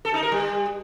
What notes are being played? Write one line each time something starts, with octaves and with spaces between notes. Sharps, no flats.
A4
D#4
A#4
G3